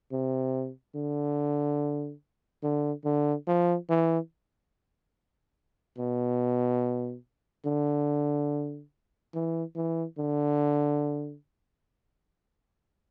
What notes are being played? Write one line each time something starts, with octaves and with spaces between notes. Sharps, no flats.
C3
D3
D3
D3
F3
E3
B2
D3
E3
E3
D3